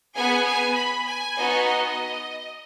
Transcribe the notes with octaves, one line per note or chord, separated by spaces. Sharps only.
B3 G#4 G#5
G#5
B5
G#5
B3 D#4 F#4
D#5